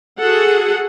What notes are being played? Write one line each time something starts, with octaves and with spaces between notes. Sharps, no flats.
F#4 G#4 A4 F#5